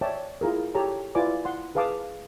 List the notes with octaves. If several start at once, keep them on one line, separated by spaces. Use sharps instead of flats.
C#5 D5 E5 G5 A5
E4 F4 G#4 A#4
G4 A4 C#5 A5 A#5
E4 F4 B4 D5 G#5 D6
F#5 C6
G#4 B4 F5 A5 D6 D#6